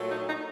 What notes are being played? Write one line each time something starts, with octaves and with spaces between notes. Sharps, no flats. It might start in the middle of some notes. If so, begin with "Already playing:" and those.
Already playing: A#2 F#3 A3
D#4
D#4